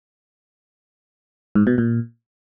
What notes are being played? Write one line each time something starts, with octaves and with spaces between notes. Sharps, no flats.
G#2
B2
A#2